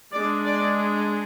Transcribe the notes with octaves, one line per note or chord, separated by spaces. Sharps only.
G#3 D4 D5
D5